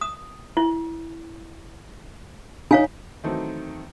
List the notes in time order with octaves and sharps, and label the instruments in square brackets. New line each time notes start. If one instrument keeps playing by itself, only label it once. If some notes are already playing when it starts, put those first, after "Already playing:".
[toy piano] D#6
E4
[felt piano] D#4 [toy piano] C#5 F5 G#5
[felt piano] D#3 E3 F#3 A3 C4 D#4